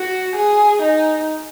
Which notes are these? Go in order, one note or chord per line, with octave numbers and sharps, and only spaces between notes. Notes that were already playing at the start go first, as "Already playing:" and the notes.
Already playing: F#4
G#4
D#4